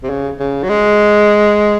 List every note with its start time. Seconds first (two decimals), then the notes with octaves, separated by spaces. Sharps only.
0.04 C3
0.09 C#3
0.40 C#3
0.64 F#3
0.69 G#3